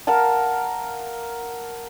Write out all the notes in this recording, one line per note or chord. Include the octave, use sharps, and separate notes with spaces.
A#4 F5 F#5 A5